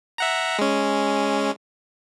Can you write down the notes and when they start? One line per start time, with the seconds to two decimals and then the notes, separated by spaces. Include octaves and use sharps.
0.18 E5 F#5 A#5
0.59 G#3 C#4